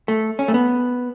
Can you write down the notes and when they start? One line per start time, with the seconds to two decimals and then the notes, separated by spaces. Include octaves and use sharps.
0.08 A3
0.39 C#4
0.48 A3
0.54 B3